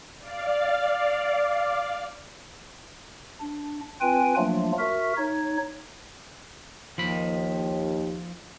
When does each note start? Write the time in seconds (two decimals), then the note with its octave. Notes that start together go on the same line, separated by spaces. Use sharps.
0.19 D5 F5
3.40 D4
4.01 C4 F4 B4 G5 G#5
4.37 F3 F#3 A3 A#3 D4 F4
4.79 F#4 A#4 E5
5.17 D#4 C#5
6.98 D#2 F3 B5